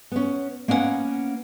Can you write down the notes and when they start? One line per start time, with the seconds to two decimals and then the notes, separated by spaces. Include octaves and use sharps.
0.12 B3 C#4
0.68 A#3 B3 C#4 D#5 F#5